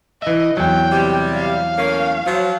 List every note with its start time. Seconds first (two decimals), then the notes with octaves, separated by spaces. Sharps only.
0.22 E3 D#5 E5
0.57 E2 F#3 G5
0.91 C3 G3
1.35 F5
1.78 A3 A#3 C#4
2.26 F3 F#3